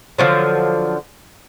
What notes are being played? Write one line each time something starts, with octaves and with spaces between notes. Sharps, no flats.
D3 F3 F#3